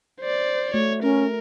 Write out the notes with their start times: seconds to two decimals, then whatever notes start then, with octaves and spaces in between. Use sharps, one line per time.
0.20 C5 D5
0.74 A3 F#4 C#5
1.03 C#4 A#4